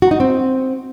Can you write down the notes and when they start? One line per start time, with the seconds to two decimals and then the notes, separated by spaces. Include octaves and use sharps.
0.02 F#4
0.11 D#4
0.20 C4